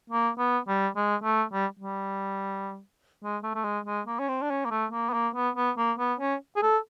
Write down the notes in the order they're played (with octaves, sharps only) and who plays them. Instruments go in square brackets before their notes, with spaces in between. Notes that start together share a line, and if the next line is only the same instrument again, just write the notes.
[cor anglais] A#3
B3
G3
G#3
A3
G3
G3
G#3
A3
A3
G#3
G#3
A#3
C#4
C4
D4
C#4
A#3
A3
A#3
B3
A#3
B3
B3
A#3
B3
C#4
G#4
A4